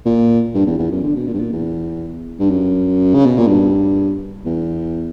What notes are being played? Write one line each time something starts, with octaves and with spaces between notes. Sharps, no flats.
A#2
G2
E2
E2
F#2
D3
B2
A#2
G2
A#2
E2
G2
F#2
C#3
B2
A#2
G2
E2